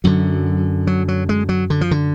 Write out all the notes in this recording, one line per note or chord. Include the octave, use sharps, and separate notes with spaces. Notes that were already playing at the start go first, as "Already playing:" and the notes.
F#2 D3 F#3
F#3
F#3
G#3
F#3
D3
F3
D3